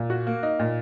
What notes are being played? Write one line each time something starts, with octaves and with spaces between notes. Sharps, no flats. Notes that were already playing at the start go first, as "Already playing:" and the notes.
Already playing: A#2
F#4
A#3
D#4
A#2